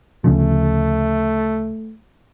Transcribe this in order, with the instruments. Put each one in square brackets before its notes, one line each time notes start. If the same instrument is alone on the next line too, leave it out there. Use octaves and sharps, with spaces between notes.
[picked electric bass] D2 C#3 F3 [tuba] A3